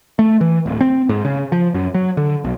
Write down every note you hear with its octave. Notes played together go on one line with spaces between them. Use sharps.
A3
E3
D1
C4
G#2
C#3
F3
F#2
F#3
D3
B1